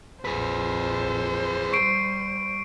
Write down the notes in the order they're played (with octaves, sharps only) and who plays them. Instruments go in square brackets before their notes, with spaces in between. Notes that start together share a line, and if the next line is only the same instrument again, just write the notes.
[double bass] A#1 F2 [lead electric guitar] G#4 B4 [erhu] C5
[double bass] G3 [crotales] C#6 C7 D7